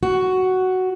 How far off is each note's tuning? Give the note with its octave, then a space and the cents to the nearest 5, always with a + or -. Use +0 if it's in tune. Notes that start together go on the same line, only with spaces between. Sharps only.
F#4 +5